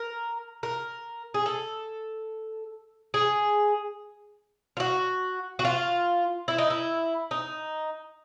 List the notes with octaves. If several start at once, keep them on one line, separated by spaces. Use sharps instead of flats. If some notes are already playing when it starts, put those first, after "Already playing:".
Already playing: A#4
A#4
G#4
A4
G#4
F4
F#4
F#4
F4
E4
D#4
E4
D#4